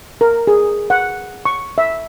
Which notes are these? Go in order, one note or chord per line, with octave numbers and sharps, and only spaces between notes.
A#4
G#4
F#5
C#6
E5